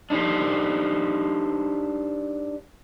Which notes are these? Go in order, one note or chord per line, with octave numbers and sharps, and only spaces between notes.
D4 D#4 G4 C5